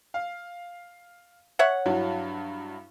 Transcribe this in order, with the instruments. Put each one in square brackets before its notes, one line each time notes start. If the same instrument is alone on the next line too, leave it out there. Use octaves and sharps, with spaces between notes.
[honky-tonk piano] F5
[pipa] C#5 E5 F#5
[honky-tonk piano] G2 F#3 E4